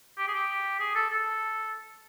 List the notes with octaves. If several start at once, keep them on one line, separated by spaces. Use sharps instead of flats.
G4
G#4
G4
G#4
A4
A4